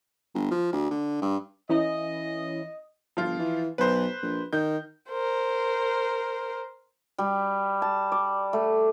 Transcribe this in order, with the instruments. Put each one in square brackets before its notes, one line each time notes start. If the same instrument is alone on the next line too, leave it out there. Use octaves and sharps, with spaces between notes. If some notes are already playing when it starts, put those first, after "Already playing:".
[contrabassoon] G1
F3
D2
D3
G2
[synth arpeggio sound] E3 C#4 E4 [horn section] D#5
[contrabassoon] G1 [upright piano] F3 F4
[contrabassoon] E3
[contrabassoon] B1 [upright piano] B4 C5
[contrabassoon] A#1
[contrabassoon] D#3 [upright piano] G6
[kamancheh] A#4 C5
[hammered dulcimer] G3
A5
D5
A3